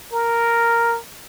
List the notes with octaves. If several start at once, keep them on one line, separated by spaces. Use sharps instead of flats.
A#4